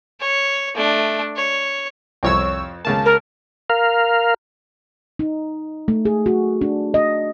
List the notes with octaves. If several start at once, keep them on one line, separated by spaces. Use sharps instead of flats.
C#5
A3 D4
C#5
C2 F2 F3 C4 C#5 E6
C#2 C#3 A#3 A5
A#4
A#4 F5
D#4
A3
G#4
F#4
D4
D#5